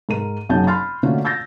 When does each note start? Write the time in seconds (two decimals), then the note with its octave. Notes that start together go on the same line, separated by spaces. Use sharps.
0.09 G#2 A#4 D#7
0.49 F#1 F#2 F#3 D#4 A5 G6
0.67 B5 C6 F6 A6
1.03 D3 A3 A#3 C#4 F4 F#4
1.25 E6 G6 A6 A#6